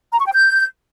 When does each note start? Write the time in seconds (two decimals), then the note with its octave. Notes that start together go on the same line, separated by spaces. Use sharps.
0.13 A#5
0.19 C#6
0.26 G5
0.32 G6